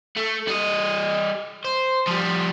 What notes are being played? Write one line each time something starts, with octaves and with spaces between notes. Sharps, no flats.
A3
G3 D#5
C5
F3 G3